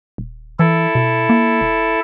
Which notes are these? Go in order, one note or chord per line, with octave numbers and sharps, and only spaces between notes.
D#1
E3 E4 A4
B2
A#3
E1